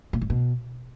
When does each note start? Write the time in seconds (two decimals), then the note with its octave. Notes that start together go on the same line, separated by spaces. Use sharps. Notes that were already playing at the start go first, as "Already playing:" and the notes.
0.13 A#2
0.21 G#2
0.30 B2